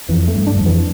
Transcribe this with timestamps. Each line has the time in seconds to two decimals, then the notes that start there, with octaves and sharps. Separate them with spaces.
0.09 F2 E3
0.28 A3
0.35 G2
0.47 D4
0.56 E2
0.60 F2
0.66 E3